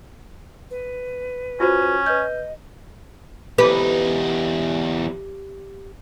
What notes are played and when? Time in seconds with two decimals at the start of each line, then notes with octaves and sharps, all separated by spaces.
0.71 B4
1.60 C#4 F4 F#4 C5
2.06 B4 D#5 G6
3.58 E2 D#4 G4 B4